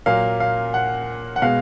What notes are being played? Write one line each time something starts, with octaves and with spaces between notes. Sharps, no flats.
A#2 F#3 A#3 F5
F5
F#5
F#5
B2 G#3 F5